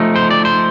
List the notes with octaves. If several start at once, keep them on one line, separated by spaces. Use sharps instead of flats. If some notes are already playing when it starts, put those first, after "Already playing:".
Already playing: F3 A3 D#4
C5
D5
C5